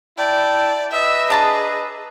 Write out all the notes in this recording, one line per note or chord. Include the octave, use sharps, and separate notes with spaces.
E4 D5 G5 A5
B4 D#5 E5
D4 G#4 A5 A#5